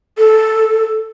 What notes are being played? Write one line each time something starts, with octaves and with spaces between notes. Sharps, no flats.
A4